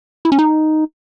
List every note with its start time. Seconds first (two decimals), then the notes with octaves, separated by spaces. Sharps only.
0.25 E4
0.32 C#4
0.39 D#4